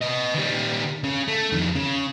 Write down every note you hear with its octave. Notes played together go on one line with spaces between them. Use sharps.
B4 D#5
D#3 G3
C#3
A3
F2 D#3
C#3